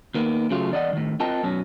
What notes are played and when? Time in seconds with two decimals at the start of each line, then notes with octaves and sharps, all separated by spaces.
0.14 D#2 D#3 A#3 B3
0.50 C#3 F#3 A3 F4
0.72 E2 D5 D#5 F#5
0.93 A2 D#3
1.20 C4 F4 A#4 D#5 G5 A5
1.43 F#2 B2 C#4